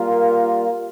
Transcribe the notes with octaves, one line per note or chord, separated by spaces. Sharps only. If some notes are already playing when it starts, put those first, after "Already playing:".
Already playing: G3 A#3 F4 A#4